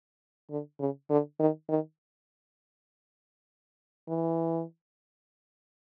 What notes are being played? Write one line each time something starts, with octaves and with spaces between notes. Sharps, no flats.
D3
C#3
D3
D#3
D#3
E3